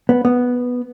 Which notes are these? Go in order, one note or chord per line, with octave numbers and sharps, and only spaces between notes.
B3
B3